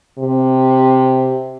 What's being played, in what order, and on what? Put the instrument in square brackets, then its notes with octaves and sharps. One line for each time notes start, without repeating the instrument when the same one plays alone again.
[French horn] C3